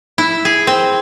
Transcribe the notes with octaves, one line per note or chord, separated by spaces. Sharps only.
E4
G#4
C4